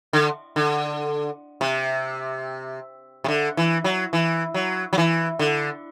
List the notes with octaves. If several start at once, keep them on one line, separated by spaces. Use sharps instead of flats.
D3
D3
C3
C3
D3
E3
F#3
E3
F#3
F#3
E3
D3